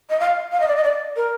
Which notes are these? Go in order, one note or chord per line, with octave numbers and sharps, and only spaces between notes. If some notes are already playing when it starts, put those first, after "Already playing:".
D#5
F5
F5
D#5
D5
D#5
D5
A#4